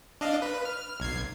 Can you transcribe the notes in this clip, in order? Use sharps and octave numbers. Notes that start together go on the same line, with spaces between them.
D4 D#5 F5
B4
F6
B1 G#6 C7